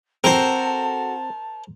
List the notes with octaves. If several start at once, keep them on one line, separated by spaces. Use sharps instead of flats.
C4 F#4 A4 A#4 C5 A5